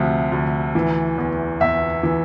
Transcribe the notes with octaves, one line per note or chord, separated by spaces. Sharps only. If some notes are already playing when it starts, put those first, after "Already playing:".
Already playing: D2 C3 F3
D2
E3
E2
E2 E5
E3